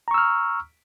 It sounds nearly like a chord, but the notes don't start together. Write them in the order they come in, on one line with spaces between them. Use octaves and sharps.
A#5 C#6 E6 F6